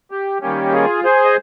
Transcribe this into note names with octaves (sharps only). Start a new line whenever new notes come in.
G4
D#3 G3 A#3 C#4 G4
F4 G#4
G#4 C5
D#5